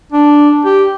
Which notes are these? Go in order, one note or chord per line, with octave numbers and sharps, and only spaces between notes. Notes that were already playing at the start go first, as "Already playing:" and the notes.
D4
G4